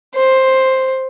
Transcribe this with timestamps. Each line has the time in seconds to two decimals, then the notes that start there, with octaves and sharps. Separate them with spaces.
0.15 C5